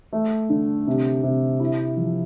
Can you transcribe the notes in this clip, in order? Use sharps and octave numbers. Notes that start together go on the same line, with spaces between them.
A3
D3
C3
C3
E4
F3